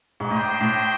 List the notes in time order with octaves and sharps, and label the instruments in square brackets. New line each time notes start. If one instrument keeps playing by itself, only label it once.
[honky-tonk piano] G#2
[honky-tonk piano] A2 [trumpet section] D4 G4 C5 D#5 G5
[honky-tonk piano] A2